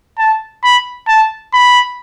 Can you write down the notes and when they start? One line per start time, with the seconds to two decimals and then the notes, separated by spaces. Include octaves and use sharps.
0.18 A5
0.64 B5
1.08 A5
1.54 B5